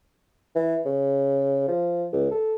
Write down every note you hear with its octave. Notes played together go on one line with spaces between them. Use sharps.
E3
C#3
F3
C#2
A4